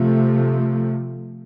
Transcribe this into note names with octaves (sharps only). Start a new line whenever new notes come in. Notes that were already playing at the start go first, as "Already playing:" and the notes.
Already playing: C3 F3 A3